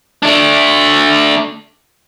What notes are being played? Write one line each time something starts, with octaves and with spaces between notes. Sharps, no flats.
A3 D4